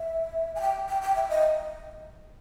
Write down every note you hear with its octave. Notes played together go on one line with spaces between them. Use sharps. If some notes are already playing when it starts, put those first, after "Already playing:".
Already playing: E5
G#5
G5
G5
G5
E5
D#5